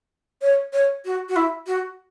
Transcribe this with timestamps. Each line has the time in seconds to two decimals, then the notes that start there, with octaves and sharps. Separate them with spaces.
0.42 C#5
0.73 C#5
1.05 F#4
1.29 F#4
1.36 E4
1.67 F#4